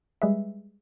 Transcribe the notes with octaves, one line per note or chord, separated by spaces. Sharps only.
G3 G#3 G#4 B4 E5